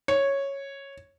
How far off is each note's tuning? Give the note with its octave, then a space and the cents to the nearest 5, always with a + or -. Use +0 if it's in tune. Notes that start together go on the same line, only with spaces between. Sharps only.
C#5 -5